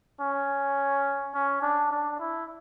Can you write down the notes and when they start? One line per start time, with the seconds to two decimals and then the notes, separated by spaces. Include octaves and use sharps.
0.20 C#4
1.34 C#4
1.62 D4
1.91 D4
2.20 E4